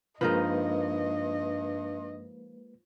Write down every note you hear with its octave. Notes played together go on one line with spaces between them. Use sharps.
G2 F3 G#3 A#3 D#4 A#4 B4 D#5